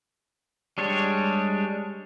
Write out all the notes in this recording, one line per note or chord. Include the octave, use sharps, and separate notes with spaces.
G3 G#3 D4 C#5